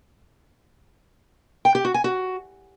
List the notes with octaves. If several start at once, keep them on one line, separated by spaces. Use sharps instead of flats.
G5
G4
F#4
G#5
F#4